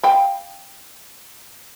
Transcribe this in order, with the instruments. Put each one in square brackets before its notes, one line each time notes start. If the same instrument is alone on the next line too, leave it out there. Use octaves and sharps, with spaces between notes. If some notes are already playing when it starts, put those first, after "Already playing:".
[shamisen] F5 G5 B5